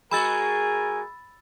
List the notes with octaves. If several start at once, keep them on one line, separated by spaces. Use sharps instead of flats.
G#3 F#4 A#4 G#5 B5 E6 A6